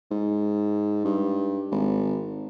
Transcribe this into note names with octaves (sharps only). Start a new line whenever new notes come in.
G#2
G2
G#1